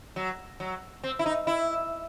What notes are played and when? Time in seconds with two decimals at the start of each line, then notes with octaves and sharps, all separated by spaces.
0.16 F#3
0.60 F#3
1.04 C4
1.19 E4
1.26 D#4
1.47 E4